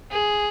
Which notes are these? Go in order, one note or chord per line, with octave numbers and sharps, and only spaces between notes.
G#4